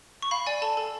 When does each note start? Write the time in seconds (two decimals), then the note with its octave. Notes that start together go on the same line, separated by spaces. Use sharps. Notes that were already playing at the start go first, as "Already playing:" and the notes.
0.22 C#6
0.31 F5 B5
0.47 D5 G#5
0.62 A4 A5
0.77 A4